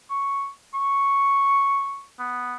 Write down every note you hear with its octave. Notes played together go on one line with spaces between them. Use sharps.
C#6
C#6
B3